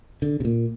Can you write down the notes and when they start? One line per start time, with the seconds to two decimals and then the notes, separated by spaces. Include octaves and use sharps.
0.22 D3
0.40 C3
0.45 A#2